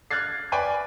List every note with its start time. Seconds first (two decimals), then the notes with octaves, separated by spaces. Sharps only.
0.11 F6 F#6 G#6 A6 C7
0.52 B4 D5 G5 G#5 B5